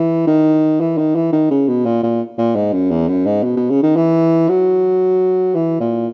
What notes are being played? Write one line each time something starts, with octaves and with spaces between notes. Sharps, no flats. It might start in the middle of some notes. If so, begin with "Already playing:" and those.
Already playing: E3
D#3
E3
D#3
E3
D#3
C#3
B2
A#2
A#2
A#2
G#2
F#2
E2
F#2
G#2
B2
B2
C#3
D#3
E3
F#3
E3
A#2